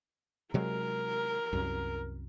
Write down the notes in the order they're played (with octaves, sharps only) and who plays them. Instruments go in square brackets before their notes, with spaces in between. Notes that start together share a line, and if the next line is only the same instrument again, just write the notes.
[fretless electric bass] C3 F#3 G#3 [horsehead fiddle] A#4
[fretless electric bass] C2 F#2